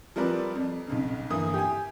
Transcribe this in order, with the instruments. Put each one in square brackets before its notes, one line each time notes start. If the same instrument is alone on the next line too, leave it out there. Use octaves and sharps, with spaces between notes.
[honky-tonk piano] F3 G3 C4 A#4 B4 D5
F2
B1 F2 C#3
G1 E3 A#3 D#6
G4 G#5